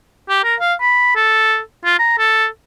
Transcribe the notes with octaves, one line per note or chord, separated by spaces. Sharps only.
G4
A#4
F5
B5
A4
F4
A#5
A4